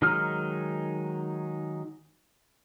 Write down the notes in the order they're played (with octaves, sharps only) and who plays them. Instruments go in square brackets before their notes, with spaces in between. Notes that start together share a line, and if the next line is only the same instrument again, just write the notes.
[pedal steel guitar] D#3 F#3 G#3 D#4 F6